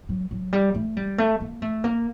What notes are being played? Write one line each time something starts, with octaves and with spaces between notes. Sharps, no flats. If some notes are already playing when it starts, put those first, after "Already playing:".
F#3
F#3
G3
A3
G3
A3
A#3
A3
A#3